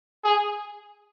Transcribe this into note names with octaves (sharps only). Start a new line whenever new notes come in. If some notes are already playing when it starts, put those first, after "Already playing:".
G#4